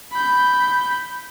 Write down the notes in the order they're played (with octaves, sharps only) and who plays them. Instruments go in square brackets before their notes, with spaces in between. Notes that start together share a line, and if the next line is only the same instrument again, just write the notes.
[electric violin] B5 G6